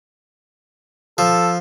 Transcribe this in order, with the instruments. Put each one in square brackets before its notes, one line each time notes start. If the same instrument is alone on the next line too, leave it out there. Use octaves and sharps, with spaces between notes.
[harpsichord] F3 [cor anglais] A4